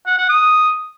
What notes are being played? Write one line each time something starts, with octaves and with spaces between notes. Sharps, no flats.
F#5
F#5
D#6